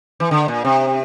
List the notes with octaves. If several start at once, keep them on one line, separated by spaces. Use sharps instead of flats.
E3
D3
A#2
C3